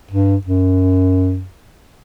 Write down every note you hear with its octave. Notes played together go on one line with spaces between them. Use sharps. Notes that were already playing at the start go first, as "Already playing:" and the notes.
G2
F#2